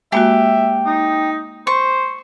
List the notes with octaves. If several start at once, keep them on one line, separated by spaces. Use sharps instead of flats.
G#3 A#3 F#4 G4 E5
D#4
C5 C#6